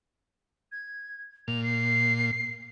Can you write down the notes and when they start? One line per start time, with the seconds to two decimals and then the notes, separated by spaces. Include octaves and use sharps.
0.72 G#6
1.48 A#2 F7
1.63 C7